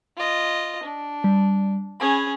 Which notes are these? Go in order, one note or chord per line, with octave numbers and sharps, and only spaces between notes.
F4 D#5
D4
G3
C#4 G#4 B5